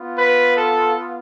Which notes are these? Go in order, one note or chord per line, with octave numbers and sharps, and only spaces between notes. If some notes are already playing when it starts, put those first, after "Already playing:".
Already playing: B3 F4
B4
A4